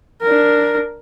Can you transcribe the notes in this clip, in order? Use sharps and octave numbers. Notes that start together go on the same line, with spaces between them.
D4 A#4